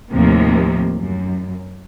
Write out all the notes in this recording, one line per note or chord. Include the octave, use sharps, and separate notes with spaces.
D#2 A2 C3 F3 A#3
F#2